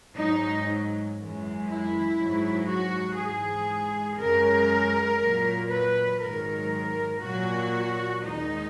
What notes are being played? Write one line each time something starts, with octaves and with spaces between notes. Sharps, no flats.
G#2 F#3 D#4
F#2 E3 G#3
E4
G#2 F#3
F#4
G#2 E3 G#3 G#4
F#2 C#3 G#3 A#4
A#2 F#3
B4
G#2 D#3 F#3 A#4
A#2 F#3 F#4
D#2 D#3 G#3 D#4